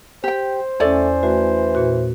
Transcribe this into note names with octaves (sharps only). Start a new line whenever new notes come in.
G4 C5 G5
E2 A3 C#4 A4 D5 G#5
E3 A3 F#4
A#2 F#4